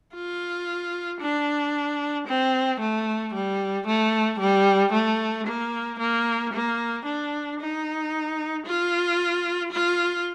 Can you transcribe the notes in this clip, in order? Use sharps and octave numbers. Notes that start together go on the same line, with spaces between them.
F4
D4
C4
A3
G3
A3
G3
A3
A#3
A#3
A#3
D4
D#4
F4
F4